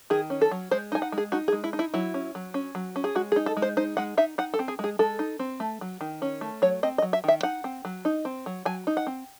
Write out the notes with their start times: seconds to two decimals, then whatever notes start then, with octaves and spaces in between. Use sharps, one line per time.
0.10 D#3 G#4
0.30 C#4
0.41 A4
0.51 F#3
0.71 G#3 C5
0.92 D#4 G#5
1.02 F#5
1.12 G#3
1.18 G#4
1.32 D#4 F#4
1.48 G#4
1.53 G#3
1.64 E4
1.73 D#4
1.79 E4
1.94 F#3 E4
2.14 C#4
2.35 F#3
2.54 C#4
2.75 F#3
2.96 C#4
3.04 G#4
3.15 G#3 F#4
3.32 G#4
3.36 D#4
3.46 A4
3.57 G#3
3.62 C5
3.77 D#4 C5
3.97 G#3 F#5
4.17 D#4 E5
4.38 D#4 F#5
4.54 A4
4.59 C4
4.68 G#4
4.79 G#3 G#4
4.99 G#3 A4
5.19 D#4
5.39 C4
5.60 A3
5.81 F#3
6.01 D#3
6.22 C#4
6.41 A3
6.62 F#3 C#5
6.83 C4 D#5
6.98 D#5
7.02 F#3
7.13 E5
7.24 D#3 E5
7.43 D#4 F#5
7.64 C4
7.85 F#3
8.05 D#4
8.25 C4
8.46 F#3
8.65 F#3 G#5
8.87 D#4
8.97 F#5
9.07 C4